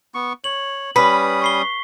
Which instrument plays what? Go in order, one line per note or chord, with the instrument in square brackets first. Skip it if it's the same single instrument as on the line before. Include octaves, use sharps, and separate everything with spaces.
[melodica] B3 C#6
[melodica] C#5 [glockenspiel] F#7
[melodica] G3 C#4 D#6 [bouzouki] B4 [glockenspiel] B6
[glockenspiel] C#6 C7 G7